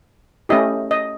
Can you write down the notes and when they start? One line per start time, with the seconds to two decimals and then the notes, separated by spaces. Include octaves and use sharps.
0.49 A3 C#4 E4 G4 D#5
0.91 D#5